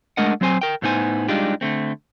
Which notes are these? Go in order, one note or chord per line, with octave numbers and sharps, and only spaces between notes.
G#3 A3 D4 A#4 D#5 F#5
F#3 C4 C5 G#5
A#4 G5
A2 A3 B3 D#4 C5 G#5
G3 G#3 D4 D#4 F4 G4
D3 A3 C4